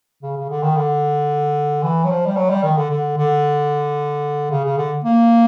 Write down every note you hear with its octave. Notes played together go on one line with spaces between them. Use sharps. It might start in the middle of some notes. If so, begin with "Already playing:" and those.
C#3
C#3
D3
D#3
D3
E3
F#3
F3
G3
F#3
G3
D#3
D3
D3
D3
C#3
C#3
D3
A#3